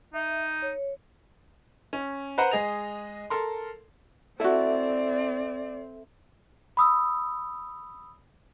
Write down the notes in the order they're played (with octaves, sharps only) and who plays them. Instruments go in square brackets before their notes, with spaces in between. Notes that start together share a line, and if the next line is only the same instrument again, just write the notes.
[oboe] D#4 [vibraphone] E5
[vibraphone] C#5
[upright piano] C#4
B4 C5 F#5 A#5
G#3 G#4 D#5 F7
A4 A#4 C6
[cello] C4 [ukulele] E4 F#4 [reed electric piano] A4 E5 [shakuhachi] D5
[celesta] B5 D#6 E6